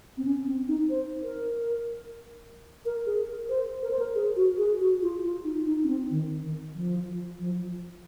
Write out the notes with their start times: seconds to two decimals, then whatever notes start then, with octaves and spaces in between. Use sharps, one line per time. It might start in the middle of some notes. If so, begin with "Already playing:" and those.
0.17 C4
0.25 C#4
0.46 C4
0.68 D#4
0.90 C5
1.23 A#4
2.85 A#4
3.06 G#4
3.29 A#4
3.49 C5
3.82 A#4
3.91 C5
3.99 A#4
4.15 G#4
4.36 F#4
4.58 G#4
4.81 F#4
5.02 F4
5.24 F4
5.44 D#4
5.67 D#4
5.84 C#4
5.88 C4
6.11 D#3
6.43 D#3
6.75 F3
7.40 F3